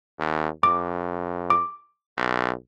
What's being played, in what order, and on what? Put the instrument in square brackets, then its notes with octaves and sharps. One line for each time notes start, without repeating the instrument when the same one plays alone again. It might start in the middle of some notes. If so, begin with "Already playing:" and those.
[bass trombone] D#2
[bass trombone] F2 [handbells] D6
[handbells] D6
[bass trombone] B1